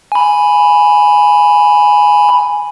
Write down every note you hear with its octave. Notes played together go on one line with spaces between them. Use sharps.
G#5 B5